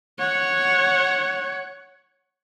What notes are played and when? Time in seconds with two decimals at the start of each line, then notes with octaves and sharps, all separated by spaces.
0.19 C#5 F#5